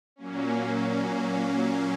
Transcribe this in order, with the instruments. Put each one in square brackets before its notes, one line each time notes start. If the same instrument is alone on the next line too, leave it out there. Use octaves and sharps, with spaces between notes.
[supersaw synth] A#2 F#3 A#3 C#4